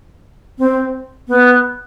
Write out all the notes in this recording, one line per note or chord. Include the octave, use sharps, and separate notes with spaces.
C4
B3